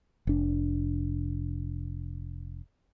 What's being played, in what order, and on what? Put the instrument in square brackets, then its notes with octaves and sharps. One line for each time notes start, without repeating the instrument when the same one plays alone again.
[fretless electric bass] F1 D4